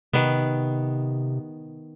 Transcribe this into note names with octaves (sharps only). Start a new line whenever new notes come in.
C3 D#3 B3